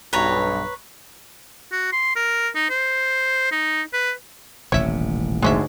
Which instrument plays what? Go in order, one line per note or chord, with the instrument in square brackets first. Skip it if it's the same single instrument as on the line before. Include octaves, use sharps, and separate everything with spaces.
[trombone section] B1 G2 [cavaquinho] B4 C#5 A#5
[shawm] F#4
C6
A#4
D#4
C5
D#4
B4
[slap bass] D#1 A1 C3 [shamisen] C#5 E5
[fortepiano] D2 G#2 [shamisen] G#3 C#4 E5